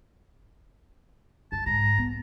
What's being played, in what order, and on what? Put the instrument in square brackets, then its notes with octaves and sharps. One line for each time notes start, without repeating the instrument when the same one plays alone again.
[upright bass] F#2 [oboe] A5
[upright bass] G#2 [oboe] A#5
[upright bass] B3